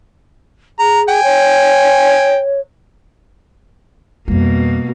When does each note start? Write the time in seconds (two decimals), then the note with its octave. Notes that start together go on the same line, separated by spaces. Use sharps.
0.79 G#4 A#5
1.09 G5 G#5
1.23 C#5
4.28 F2 B2 G3 A#3